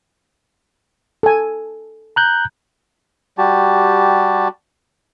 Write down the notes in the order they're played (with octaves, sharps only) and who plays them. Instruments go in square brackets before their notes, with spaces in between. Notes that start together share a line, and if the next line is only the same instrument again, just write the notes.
[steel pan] A4 G#5
[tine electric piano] A#5 F#6 G6
[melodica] G3 F#4 G4 A5